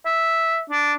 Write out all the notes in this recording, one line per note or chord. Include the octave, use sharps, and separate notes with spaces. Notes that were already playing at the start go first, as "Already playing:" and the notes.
E5
D4